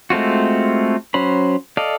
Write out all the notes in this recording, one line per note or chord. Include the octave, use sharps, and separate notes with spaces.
G#3 A3 C4 F4 F#4
F#3 C#4 C5 B5
A4 D5 D#5 F5